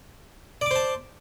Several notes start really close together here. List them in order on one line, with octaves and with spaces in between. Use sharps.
D5 D6 C5 A5